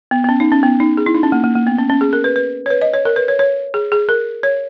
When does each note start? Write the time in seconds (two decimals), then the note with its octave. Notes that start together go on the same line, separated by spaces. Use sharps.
0.11 B3
0.24 B3
0.29 C#4
0.40 D#4
0.52 C#4
0.63 B3
0.80 D#4
0.97 G#4
1.06 E4
1.15 D#4
1.23 C#4
1.32 A#3
1.44 A#3
1.55 A#3
1.67 B3
1.78 C#4
1.90 C#4
2.01 G#4
2.13 A#4
2.24 B4
2.36 B4
2.66 C#5
2.70 B4
2.81 D#5
2.94 C#5
3.05 A#4
3.16 B4
3.28 C#5
3.39 C#5
3.74 G#4
3.92 G#4
4.09 A#4
4.43 C#5